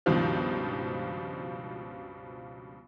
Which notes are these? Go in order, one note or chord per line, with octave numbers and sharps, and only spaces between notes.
C#2 G2 B2 D#3 F3